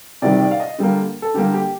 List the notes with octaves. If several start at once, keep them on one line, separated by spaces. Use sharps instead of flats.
C3 D#3 G3 D5
D5
F5
D#5
D3 G3 A#3
A4
D3 G3 A#3 G4
G4